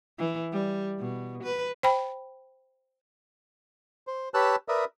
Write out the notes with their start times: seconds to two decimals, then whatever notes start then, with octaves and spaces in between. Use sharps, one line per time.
0.19 E3
0.52 G3
0.99 B2
1.43 B4
1.83 C5 G5 B5
4.07 C5
4.34 G4 B4 C#5 A5 E6 F#6
4.68 A#4 B4 D5 E5 D#6